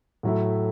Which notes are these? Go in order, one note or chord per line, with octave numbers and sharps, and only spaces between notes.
A2 F#3 A3 E4